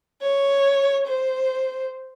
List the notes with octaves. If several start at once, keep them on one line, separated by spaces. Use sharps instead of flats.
C#5
C5